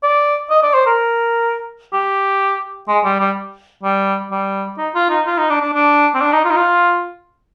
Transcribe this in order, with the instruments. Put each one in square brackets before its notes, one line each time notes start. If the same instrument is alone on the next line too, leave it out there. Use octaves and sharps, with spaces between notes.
[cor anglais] D5
D#5
D5
C5
A#4
G4
G#3
G3
G3
G3
G3
D#4
F4
D#4
F4
D#4
D4
D4
D4
C4
D4
D#4
F4
D#4
F4